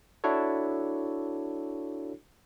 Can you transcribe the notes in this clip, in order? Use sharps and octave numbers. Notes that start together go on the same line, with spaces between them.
D4 E4 F#4 A4 C#5